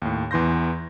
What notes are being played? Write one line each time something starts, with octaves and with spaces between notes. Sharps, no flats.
D#2 A2
E2 E3 C6 G6 A#6